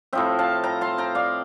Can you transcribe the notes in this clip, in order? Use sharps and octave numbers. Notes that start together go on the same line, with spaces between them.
A2 F3 C4 E5 G5
F5 A5
G5 A#5
A5 C6
G5 A#5
D5 F5